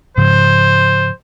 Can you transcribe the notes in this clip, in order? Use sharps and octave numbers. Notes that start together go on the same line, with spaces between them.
G#2 C#3 F3 C5